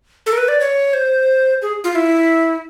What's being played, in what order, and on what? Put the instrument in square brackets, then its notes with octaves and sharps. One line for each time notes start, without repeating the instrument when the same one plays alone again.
[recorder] A4
A#4
B4
D5
C#5
C5
G#4
F4
E4